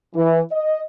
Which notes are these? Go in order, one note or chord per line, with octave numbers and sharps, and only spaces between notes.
E3
D#5